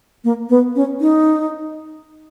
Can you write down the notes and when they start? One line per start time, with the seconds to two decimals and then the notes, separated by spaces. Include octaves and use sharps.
0.24 A#3
0.49 B3
0.76 C#4
1.01 D#4